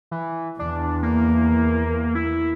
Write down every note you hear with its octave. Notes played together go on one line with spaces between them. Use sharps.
E3
E2 D4
A#3
E4